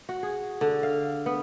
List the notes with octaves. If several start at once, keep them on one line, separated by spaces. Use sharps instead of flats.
F#4
G#4
D3
F5
B3